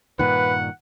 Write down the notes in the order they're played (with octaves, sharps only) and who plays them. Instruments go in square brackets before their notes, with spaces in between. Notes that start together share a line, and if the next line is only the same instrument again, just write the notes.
[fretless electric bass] G2 A#2 D#3 [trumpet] B4 [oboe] F#5